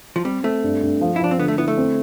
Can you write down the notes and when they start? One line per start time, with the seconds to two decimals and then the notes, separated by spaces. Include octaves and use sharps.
0.16 F3
0.25 G3 C4
0.43 A3 C4
0.64 G2
0.82 G2
1.01 F3
1.16 E4
1.20 F3 D4
1.31 C4
1.38 D3 B3
1.48 A3
1.58 B3 E4
1.68 A3
1.77 C4